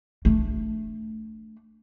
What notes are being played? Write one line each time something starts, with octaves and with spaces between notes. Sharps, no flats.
A3 D4